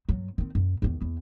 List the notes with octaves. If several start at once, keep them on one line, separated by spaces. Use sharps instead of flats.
G2 F#3
D#3 C4
F#2
E2 D#3
E2